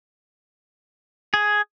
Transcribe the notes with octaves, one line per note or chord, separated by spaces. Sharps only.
G#4